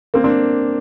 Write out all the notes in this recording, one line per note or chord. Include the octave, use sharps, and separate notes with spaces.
A#3 C4
C4 D4